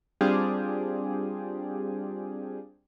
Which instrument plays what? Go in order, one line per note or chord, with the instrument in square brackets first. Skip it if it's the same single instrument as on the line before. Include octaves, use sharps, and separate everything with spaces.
[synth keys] G3 C4 D4 F4 G4 G#4